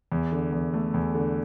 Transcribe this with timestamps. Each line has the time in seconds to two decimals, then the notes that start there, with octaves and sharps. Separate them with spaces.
0.12 E2
0.32 D3
0.52 E2
0.74 A3
0.94 E2
1.14 D3